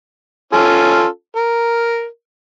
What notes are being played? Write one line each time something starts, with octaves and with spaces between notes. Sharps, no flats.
C#4 F4 A4
A#4